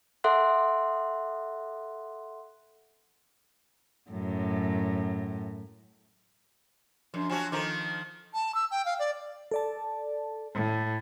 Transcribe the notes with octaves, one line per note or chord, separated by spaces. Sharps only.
A4 E5 F#5 C6 F#6
F#2 A2
F#2 F3 D4
F3 F#3 F#4 G#5 A5
D#3 F3 A4 A#5 D6
A5
E6
G5
F5
D5
A4 D5 A5
A2